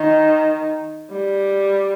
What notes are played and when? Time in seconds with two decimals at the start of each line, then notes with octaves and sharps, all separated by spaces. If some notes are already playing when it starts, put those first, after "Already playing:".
Already playing: D#3
1.11 G3